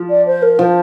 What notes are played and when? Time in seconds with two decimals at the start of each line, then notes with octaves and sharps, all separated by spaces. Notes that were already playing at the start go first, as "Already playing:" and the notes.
Already playing: F3
0.10 D5
0.26 C5
0.42 A#4
0.59 F3 C5